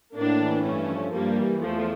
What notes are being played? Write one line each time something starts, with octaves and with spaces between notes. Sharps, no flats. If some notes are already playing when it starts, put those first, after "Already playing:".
A2 A#3 D4
E3
G2 A3 C#4
F3
G2 G3 A#3
E3
E2 F3 A3